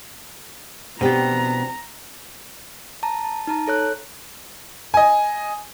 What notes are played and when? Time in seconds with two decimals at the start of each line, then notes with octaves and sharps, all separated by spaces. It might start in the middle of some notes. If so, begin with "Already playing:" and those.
1.01 B2 B3 C4 D4 G4 A#5
3.03 A5 A#5
3.24 A5
3.47 D#4 A5 A#5
3.67 A4 C#5 F#6
4.94 D#5 G#5